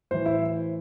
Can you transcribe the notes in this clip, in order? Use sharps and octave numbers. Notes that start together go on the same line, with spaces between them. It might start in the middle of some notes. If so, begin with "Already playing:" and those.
A2 E3 C5
E4